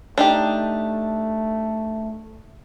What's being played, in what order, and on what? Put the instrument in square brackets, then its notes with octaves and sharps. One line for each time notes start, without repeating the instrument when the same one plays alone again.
[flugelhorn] A3 [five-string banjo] D4 D#4 G4